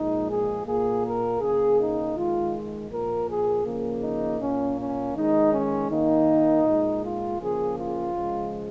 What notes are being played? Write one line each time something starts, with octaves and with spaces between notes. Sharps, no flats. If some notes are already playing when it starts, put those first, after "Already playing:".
Already playing: A#2 F3 G#3 D#4
G#4
A#2 A#3 G#4
A#4
C#3 A#3 G#4
D#4
D#3 G#3 F4
A#2 F3 A#3 A#4
G#4
C#3 F3 A#3
D#4
A#2 A#3 C#4
C#4
D#3 G#3 D#4
C#4
D#3 A#3 D#4
A#2 G#3
F4
C#3 F3 A#3 G#4
F4
C#3 F3 G#3